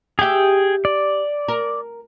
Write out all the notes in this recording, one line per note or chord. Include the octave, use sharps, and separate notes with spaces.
G4 G#4 E5 G5
D5
A#4